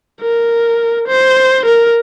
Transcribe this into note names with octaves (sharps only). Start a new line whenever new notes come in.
A#4
C5
A#4